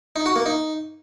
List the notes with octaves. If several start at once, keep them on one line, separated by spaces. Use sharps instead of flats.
D#4
F#4
A#3
D#4